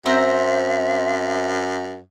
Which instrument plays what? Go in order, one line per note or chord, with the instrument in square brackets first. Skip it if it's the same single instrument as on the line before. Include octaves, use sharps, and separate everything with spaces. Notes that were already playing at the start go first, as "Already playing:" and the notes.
[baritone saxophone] F#2 [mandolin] C4 C5 A#5 [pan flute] E5